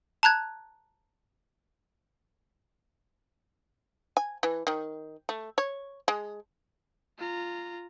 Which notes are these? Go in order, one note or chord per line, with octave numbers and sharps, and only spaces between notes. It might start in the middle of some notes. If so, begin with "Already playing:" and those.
A5 A#5 F#6 G#6
G#5
E3
D#3
A3
C#5
G#3
F4 A#5